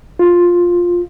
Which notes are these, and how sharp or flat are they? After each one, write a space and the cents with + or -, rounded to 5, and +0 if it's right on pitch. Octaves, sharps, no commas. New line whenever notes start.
F4 +5